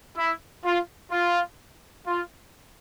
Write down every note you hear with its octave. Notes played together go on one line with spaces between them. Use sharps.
E4
F4
F4
F4